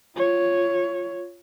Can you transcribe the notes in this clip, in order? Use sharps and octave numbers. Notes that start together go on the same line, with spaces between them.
F4 C#5